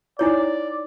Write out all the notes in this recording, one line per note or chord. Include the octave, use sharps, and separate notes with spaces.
D#4 E4 C#5 D5